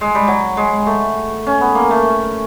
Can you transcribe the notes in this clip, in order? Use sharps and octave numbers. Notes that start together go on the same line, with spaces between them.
G#3
G3
F#3
G#3
A3
C#4
B3
A#3
A3